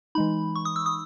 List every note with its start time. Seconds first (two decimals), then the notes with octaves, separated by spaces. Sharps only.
0.15 E3 G#3 D#4 B5
0.56 C#6
0.65 D#6
0.76 E6
0.86 D#6